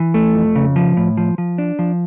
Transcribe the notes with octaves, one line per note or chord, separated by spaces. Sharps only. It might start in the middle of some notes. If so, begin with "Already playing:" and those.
Already playing: E3
A3
F2
C#3
F3
A2
F3
F3
D4
F3